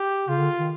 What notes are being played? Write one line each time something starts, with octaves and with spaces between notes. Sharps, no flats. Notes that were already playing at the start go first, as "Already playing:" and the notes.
Already playing: G4
C#3 F4
D3
D#3